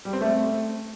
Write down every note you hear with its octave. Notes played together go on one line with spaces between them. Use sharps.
G3
C4
A3